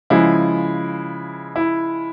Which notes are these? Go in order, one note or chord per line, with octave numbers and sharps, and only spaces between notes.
C#3 F3 G#3 E4
E4